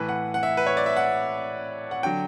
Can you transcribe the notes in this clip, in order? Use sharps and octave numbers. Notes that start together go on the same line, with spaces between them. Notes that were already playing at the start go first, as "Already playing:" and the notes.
Already playing: A2 E3 B4
F#5
F#5
E5
B4
C#5
D5
E5
F#5
F#5
D3 F#3 G5